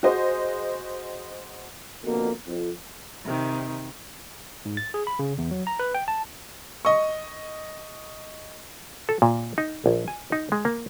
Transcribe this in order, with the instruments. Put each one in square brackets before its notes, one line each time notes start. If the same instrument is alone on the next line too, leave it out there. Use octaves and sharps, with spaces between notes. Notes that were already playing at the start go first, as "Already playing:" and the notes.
[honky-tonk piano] F#4 G#4 C5 D#5
[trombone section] F2 B2 D3 A#3
F2
[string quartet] C3 D#3
[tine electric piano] G#2
A6
G#4
B5
C#3
E2
F#3
A#5
B4
G5
A5
[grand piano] D#5 C#6
[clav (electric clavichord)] A4
A#2
D#4
A#1
G#5
D#4
G#3
A#3